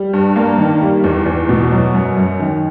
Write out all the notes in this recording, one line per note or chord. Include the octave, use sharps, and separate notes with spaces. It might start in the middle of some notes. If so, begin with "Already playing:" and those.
Already playing: G3
G2
A#3
D#3
G3
E2
E2
B2
F#3
F#2
F#2
D#3